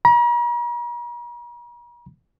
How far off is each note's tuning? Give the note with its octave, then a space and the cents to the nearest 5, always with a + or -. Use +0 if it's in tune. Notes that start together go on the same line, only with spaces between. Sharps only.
A#5 +45